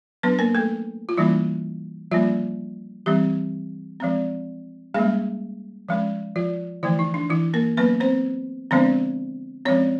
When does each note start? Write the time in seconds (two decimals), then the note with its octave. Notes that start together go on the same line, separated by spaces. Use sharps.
0.23 F#3 B3 D4 B4
0.39 A#3 A#4
0.55 A3 A4
1.09 F4
1.18 E3 G3 A#3 C#4 E4
2.11 F3 G3 A#3 C#4 F4
3.06 E3 G3 C4 G4
4.00 F3 G#3 C4
4.94 G3 G#3 A#3 C#4 G#4
5.89 F3 G#3 C#4
6.36 F3 F4
6.83 D3 E3 F3 A3 E4
6.99 D#4
7.14 D4
7.30 E3 E4
7.54 A#3 A#4
7.77 F#3 A#3 B3 C#4 B4
8.00 C4 C5
8.71 D3 F3 G#3 B3 C4 D4 C5
9.65 F3 G#3 C4 C#4 C#5